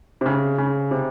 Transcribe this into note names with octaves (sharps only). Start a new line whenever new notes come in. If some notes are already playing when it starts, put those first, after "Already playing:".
C3
C#3
C#3
C3